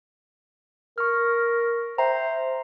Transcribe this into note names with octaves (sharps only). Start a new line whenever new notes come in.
A#4 C#6 F6
C5 E5 G5 A#5